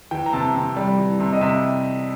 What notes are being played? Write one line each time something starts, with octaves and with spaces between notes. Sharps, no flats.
E3 G5
A#5
C3 A5
C3
G3
E3
C3
D#5
C3 E5